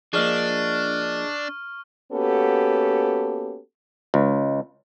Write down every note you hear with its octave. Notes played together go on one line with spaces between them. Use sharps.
F3 A#3 D4 G#4 D5 D#5 C#6 F6
A#3 B3 C#4 F#4 G4 A4
C#2